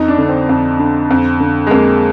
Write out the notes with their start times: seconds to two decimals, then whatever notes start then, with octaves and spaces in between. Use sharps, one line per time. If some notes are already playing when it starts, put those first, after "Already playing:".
Already playing: F2 D#4
0.08 D4
0.18 D3
0.29 C4
0.49 F2
0.79 D3
1.11 F2
1.40 D3
1.67 G#3
1.71 F2 A#3